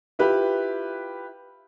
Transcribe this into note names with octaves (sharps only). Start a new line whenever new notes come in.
E4 F4 G4 B4